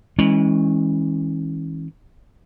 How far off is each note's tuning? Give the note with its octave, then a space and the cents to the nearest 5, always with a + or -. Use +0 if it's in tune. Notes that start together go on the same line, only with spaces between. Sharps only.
E3 -40 G#3 -15 C#4 -20